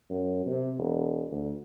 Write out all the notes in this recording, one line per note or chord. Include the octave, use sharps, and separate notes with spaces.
F#2
C3
E1
D2